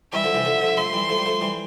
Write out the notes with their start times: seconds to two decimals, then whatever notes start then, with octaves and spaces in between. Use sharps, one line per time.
0.13 E3 G3 E5
0.24 D3 F3
0.34 C3 E3
0.45 D3 F3
0.61 D3 F3
0.77 F3 A3 C6
0.93 E3 G3
1.09 F3 A3
1.18 G3
1.26 F3 A3
1.41 E3 G3